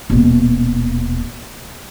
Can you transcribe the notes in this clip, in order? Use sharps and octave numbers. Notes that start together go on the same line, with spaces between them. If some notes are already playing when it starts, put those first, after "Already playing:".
D#1 B2